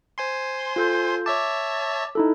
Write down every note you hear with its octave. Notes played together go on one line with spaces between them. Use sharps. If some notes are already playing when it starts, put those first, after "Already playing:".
C5 G#5 C6
F4 A4 G6
C#5 E5 A5 D6
D#4 E4 A4